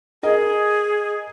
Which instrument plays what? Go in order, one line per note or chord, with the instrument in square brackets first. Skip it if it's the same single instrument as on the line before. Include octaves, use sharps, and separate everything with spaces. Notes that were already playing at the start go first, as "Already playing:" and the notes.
[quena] G#4 [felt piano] A#4 D#5